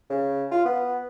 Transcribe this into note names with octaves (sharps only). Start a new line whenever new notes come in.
C#3
F4
B3